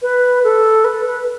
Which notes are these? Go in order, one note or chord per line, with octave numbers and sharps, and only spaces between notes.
B4
A4
B4
B4